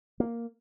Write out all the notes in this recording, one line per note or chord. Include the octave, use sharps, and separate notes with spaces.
A#3